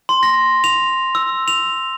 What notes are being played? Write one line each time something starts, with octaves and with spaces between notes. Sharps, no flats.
C6
A#6
F7
E6
F7